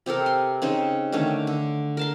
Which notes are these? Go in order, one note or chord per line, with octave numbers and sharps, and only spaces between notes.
C3 G4 A4 A#4
C6
C#3 C4 D#4 C5
D3 D#3 A3 C#4
D3
A#4 A5 C6